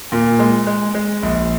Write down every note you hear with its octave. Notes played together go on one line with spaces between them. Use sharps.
A#2
G#3
G#3
G#3
A#1